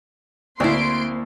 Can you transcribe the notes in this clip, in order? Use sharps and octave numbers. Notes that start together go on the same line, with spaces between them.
D2 A#3 C4 E4 C6 D7